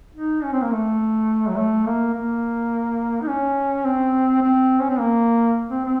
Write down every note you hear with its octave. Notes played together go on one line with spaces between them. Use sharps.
D#4
C#4
C4
A#3
A3
F#3
A3
A#3
A#3
D#4
C#4
C4
C4
C#4
C4
A#3
C4
C4